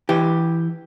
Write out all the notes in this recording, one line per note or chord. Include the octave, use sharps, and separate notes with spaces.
E3 G4